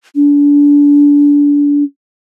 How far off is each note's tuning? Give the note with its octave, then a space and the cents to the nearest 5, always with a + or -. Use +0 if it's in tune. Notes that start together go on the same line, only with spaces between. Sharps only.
D4 -25